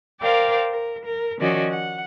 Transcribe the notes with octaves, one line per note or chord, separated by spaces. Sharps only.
A#4 C5 D5 F5 G5
A#4
A#4
D#3 F3 C#4 F#4 D5 D#5
F#5